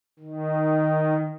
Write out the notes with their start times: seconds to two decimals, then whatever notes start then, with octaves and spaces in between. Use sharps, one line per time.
0.19 D#3